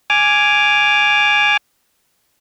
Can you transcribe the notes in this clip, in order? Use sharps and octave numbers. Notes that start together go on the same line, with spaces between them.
G#5 D6 F6